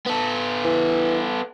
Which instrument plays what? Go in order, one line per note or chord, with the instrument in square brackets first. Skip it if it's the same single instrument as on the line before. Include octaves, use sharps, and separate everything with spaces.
[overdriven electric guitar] B3 A4
[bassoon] E3